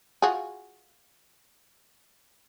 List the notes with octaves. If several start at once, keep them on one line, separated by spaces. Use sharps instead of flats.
F4 F#4 G#4